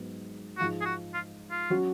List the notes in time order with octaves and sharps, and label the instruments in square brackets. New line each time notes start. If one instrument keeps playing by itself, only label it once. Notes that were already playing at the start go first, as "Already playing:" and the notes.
Already playing: [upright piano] G#2 F#3 B3
[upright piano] G#2 F3 G#3 [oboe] F#4
[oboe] G#4
F#4
F4
F4
[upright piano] F#3 C#4 F#4